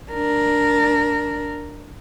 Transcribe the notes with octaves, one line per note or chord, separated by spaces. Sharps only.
D4 A#4